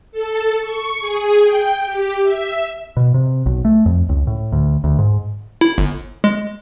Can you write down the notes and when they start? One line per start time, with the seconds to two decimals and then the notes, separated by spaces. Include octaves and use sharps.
0.12 A4
0.61 C#6
1.00 G#4
1.41 G5
1.85 G4
2.22 E5
2.97 B2
3.14 C3
3.46 B1
3.65 A3
3.86 F2
4.09 C#2
4.27 A2
4.52 D2
4.84 D2
4.98 G#2
5.61 E4
5.78 G1
6.24 G#3